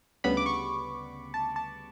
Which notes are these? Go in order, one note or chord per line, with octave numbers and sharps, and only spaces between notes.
D2 C#3 G3 B3 B5
D6
C#6
A5
A5